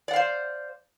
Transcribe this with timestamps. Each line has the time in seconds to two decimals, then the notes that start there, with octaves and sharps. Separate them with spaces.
0.08 D5
0.11 F#5
0.13 F5
0.16 C5